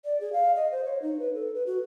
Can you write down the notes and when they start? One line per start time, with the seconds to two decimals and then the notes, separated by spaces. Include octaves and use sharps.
0.05 D5
0.21 G#4
0.33 F5
0.56 D#5
0.72 C5
0.85 C#5
1.02 D#4
1.20 B4
1.34 A4
1.54 B4
1.66 F#4